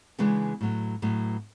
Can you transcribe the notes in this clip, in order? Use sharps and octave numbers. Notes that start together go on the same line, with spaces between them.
C#3 E3 G#3 B3 D4
A2 F#3 B3
A2 F#3 B3